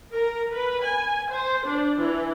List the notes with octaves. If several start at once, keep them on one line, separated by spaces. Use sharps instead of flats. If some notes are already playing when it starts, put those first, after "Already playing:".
A#4
B4
G#5
C5
D4
E3